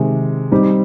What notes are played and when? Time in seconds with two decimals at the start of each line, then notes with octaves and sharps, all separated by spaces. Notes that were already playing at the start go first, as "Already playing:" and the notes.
Already playing: C3 D#3 G#3
0.51 G3 C4 D#4